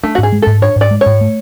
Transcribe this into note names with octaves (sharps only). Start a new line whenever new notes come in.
A3 D4
F#4
G#2
G#4
G#3
G#2 A4
D4 C#5
G#2
D5
G#3
G#2 C#5
A3